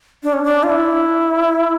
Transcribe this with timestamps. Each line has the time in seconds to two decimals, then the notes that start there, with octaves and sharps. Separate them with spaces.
0.23 D4
0.33 C#4
0.44 D4
0.63 F4
0.70 E4